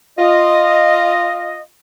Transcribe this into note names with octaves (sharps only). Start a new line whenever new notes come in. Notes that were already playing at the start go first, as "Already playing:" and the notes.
F4 D#5